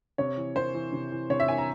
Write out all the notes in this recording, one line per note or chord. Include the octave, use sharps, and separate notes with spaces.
C3 C#5
E3
C3 C5
E3
C3
E3
C3 C#5
E5
E3 G#5
A#5